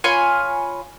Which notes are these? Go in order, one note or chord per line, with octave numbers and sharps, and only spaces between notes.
F4 C#5 G#5 B5